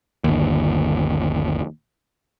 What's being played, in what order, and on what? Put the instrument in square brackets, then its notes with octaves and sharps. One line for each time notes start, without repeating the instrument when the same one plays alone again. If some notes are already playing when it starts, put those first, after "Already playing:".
[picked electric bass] G1 D#2